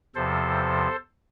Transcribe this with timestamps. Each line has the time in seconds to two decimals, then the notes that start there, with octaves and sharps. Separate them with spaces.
0.15 E2 C3 F3 A4 C5